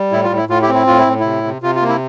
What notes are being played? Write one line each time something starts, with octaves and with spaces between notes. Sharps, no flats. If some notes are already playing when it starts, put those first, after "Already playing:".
Already playing: G3
A2 E4
F4
A2
E4
A2 F4
E4 G4
C4
E4
A2 F4
E4
A2
C3 E4
C3
C3 F4
F4
A#3
E4